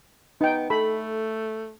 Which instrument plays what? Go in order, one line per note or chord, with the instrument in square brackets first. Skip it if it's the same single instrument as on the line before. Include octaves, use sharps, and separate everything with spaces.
[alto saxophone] B3 [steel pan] D#4 G5
[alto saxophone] A3 [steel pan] A4 B5